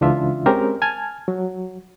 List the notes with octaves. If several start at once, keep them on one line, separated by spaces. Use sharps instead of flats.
C#2 E3 D4 F4 E5
G#3 C4 C#4 G4 A#4
G#5 A5 F6 G#6
F#3